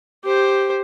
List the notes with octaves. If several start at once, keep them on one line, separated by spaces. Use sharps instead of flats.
G4 C5